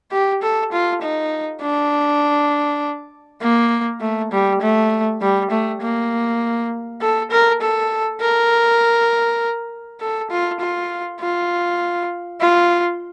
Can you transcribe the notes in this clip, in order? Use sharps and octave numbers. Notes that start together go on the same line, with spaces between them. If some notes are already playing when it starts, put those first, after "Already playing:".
G4
A4
F4
D#4
D4
A#3
A3
G3
A3
G3
A3
A#3
A4
A#4
A4
A#4
A4
F4
F4
F4
F4